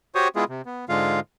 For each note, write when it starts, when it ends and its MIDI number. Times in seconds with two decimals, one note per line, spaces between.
0.15 0.28 66
0.15 0.28 67
0.15 0.28 72
0.15 0.28 73
0.15 0.28 85
0.15 0.28 87
0.36 0.44 56
0.36 0.44 59
0.36 0.44 64
0.36 0.44 65
0.36 0.44 68
0.49 0.62 48
0.66 0.85 59
0.89 1.20 44
0.89 1.20 50
0.89 1.20 56
0.89 1.20 65
0.89 1.20 77